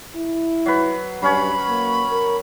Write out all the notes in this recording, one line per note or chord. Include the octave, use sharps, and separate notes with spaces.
E4
F#3 B4
G2 F#3 C#4 C#5 B5
A#3
A#4